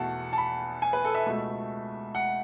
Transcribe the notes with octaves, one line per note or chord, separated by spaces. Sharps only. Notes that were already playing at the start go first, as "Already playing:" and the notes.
Already playing: E2 B2 A3 F#5 A5
A5
B5
G#5
B4
A4
E5
C#2 B2 A3
F#5